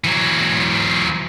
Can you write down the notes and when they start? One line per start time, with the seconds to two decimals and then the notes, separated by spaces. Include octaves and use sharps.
0.04 E3 F#3